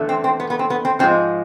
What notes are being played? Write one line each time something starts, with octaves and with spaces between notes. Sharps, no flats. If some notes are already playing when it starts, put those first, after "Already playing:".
Already playing: E2 D3 A3
C4
C4
B3
B3
C4
B3
C4
G#2 F3 G#3 C4